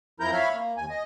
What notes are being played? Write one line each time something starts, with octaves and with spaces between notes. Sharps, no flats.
F2 F3 E4 A#4 A#5 G6
C#5 E5 F5 B5 F6
A#3
D#2 G#5
D#5